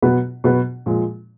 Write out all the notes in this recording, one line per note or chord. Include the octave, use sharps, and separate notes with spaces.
B2 F#3 B3 F#4 B4
B2 F#3 B3 F#4 B4
A#2 F3 G#3